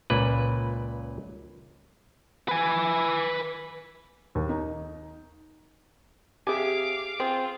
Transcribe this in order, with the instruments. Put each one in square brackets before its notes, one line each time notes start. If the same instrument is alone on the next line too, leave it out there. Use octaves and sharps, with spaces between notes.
[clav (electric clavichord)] C#2 A#2 B4
[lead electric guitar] B4 G#5
[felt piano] D#2
D#4
[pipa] C3 G#5 [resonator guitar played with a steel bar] G4 G#4 [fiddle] F5 D6
[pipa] C4 [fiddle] F4 [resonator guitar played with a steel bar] G#4